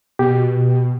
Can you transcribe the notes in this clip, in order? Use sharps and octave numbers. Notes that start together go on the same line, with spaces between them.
B2 G4